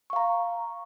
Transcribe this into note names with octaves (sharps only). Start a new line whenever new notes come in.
F5 A#5 C#6